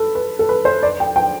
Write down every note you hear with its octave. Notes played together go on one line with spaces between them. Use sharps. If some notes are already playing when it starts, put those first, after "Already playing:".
Already playing: A4 B4
B4
A4
B4
C5
D5
G5
G5